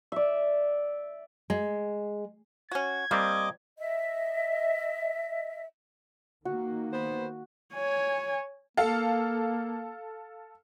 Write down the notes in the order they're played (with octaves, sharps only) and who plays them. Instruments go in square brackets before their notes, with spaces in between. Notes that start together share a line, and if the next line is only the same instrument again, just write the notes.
[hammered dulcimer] D5 E5
[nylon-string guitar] G#3
[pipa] C#4 F#4 [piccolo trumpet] G#6
[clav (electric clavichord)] G3 C4 [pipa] A#3 [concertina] D#5 D6
[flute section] D#5 E5
[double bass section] D#3 A#3 [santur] F#4
[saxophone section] B3 C5
[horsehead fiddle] C#5 G#5
[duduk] A#3 [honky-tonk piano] A4 F5